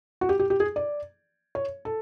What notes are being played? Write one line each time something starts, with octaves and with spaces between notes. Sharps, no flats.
F#4
G4
G4
G4
G#4
D5
C#5
A4